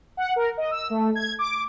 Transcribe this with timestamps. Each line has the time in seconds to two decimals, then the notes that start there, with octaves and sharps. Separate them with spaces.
0.17 F#5
0.36 A#4
0.57 D#5
0.71 E6
0.90 A3
1.15 G#6
1.39 D6